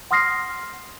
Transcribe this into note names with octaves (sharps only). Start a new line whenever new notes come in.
F#5 C6 D#6 F6 A#6 C7